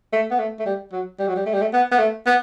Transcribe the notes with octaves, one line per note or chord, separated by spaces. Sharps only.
A3
B3
A3
A3
G3
F#3
G3
F#3
G3
A3
G3
A3
B3
B3
A3
B3